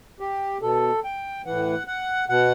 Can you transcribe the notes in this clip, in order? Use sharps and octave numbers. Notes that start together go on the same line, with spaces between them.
G4
B2 A4
G5
A2 E3 F#5
F#5
B2 F#5